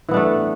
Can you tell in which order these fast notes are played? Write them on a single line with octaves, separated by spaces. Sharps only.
E3 B3 D4 A3